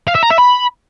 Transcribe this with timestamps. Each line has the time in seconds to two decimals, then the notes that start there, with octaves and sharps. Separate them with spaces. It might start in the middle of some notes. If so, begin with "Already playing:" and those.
0.08 F5
0.15 E5
0.23 A#5
0.30 E5
0.38 B5